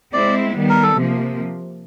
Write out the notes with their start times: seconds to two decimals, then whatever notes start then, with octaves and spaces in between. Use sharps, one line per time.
0.13 G#3 C4 E4 D5
0.55 D#3 G3 B3
0.69 A#4
0.83 A4
0.97 C3 F3 A#3